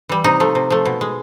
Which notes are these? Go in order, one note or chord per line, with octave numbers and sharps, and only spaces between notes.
E3 G3
C3 D#4
F3 A3
C3
F3 A3
B2
G#3